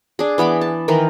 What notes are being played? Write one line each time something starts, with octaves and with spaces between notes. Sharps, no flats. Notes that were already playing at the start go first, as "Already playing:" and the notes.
D4 G#4
E3 B3 B5 D6
A5
D#3 E3 A#4 B4